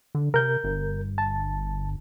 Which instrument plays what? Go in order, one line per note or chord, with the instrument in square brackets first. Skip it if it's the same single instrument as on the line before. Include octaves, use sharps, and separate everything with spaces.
[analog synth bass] D3
[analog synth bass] C3 [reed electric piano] A#4 G6
[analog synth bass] G1
[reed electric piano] A5